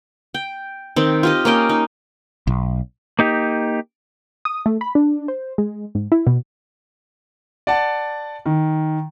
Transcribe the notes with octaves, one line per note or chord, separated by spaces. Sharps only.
G5
D#3 C4
F4 G4 D#5
A#3 C#4 D#5 G5
D#4
B1
A#3 D#4 G4
D#6
A3
B5
D4
C5
G#3
G#2
E4
B2
D5 F#5 A5
D#3